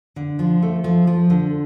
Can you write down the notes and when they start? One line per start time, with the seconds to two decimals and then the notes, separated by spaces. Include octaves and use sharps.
0.16 D3
0.39 F3
0.62 A3
0.84 F3
1.07 F3
1.30 D3